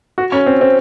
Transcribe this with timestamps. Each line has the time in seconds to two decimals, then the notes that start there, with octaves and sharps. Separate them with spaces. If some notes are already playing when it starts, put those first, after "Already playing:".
0.18 F#4
0.32 C#4
0.46 C4
0.61 C4